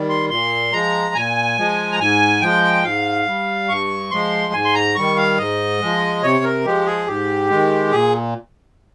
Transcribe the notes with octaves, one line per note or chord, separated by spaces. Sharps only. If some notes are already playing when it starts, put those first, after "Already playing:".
Already playing: D#3 G3
C6
A#2 C6
F3 G#3 A#5
A#2 G#5
F3 G#3
A#5
G#2 G#5
F3 G#3 G5
G#2 F5
G3
G2 C#6
F3 G#3 C6
G#2 G#5
C6
A#5
D#3 G3 C#6
F5
G#2 D#5
F3 G#3
C3 C#5
A#4
F3 G#3 G4
G#4
G#2 G4
D#3 G#3
A#2 G#4